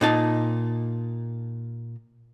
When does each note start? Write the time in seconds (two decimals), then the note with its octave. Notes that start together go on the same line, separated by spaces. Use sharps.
0.01 A#2 D#4 A5